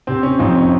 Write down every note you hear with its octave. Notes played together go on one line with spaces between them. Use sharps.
C3 C4
C#4
F2 C4 D#4
C#4